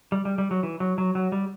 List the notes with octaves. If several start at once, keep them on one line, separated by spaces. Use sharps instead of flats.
G3
G3
G3
F#3
E3
F#3
F#3
F#3
G3